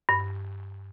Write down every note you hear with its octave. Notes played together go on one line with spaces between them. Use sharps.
G2